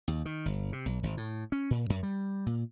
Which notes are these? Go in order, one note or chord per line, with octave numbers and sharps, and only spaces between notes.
D#2
D#3
G1
C3
B1
G#1
A2
C#4
A#2
F#2
G3
A#2